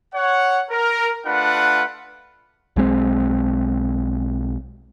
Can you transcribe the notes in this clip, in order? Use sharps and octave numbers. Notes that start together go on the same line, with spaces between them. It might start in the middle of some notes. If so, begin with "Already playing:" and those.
C#5 F#5
A#4
A3 D4 F4 B4 F#5
B1 G#3 C4